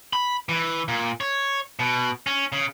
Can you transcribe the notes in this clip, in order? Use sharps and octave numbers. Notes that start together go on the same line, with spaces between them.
B5
E3
A#2
C#5
B2
C#4
C#3